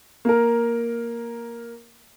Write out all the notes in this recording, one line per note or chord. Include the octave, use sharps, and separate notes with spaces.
A#3 A#4